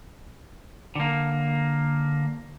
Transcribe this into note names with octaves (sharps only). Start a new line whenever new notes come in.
D3 A#3